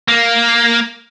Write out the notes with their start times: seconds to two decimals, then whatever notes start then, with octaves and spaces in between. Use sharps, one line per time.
0.08 A#3